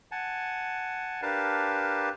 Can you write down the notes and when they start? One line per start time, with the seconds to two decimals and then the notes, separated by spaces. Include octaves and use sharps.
0.12 F#5 G#5 A5
1.22 D4 G4 A#4 B4 F5 A5